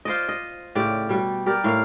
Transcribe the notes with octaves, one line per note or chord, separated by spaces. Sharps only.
F4 C5 D5 D#5
D#5
A2 C#3 G4 D5
B2 G3
G4 A#4 D5
A2 A#3 F5